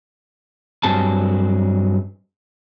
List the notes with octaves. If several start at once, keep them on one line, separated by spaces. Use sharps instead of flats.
G2 F#3 C4 G#4 A5